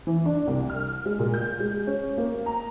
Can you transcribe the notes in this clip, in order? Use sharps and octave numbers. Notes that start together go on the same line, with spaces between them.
E3
D4
C2
F6
G#3
A#2
G6
G#3
C#4
A#3
A#5